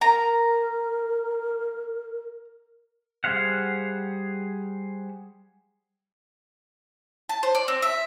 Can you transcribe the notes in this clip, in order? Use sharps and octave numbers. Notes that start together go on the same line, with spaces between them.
A#4 A#5
G3 G#4 C5 F5 F#5
A5
C5
D5
C4
E5